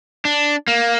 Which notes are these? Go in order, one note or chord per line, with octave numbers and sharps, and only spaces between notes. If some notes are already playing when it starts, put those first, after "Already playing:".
D4
A#3